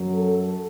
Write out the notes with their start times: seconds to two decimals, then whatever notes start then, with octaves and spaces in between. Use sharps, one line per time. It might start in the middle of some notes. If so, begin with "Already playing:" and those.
Already playing: F#2 F#3
0.15 A4